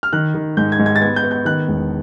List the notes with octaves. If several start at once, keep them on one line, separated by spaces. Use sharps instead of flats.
F6
D#3 F#6
D#3
G#2 G6
G#6
G#2
G#6
A6
B3 G#6
G6
B3
G6
D#3 F#6
E1